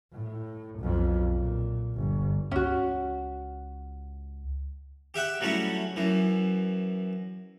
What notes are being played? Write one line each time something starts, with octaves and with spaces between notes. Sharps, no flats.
A2
B1 F2
A#2
G1
C#2 C#4 F#4
G4 E5 F#5 G5
F#3 G3 A3 C#4 E4
F#2 E3